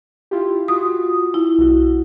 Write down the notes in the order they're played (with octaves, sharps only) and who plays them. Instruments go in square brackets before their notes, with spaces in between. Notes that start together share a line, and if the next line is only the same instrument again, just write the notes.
[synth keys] E4 F4 G4
[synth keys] F4 F#4 [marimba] D#6
[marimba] E4
[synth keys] B1 F#4